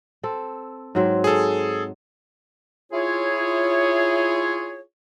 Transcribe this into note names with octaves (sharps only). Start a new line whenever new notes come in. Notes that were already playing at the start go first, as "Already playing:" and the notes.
C4 A4
G#2 F#3 C4
G#4 A4
E4 F4 G#4 C#5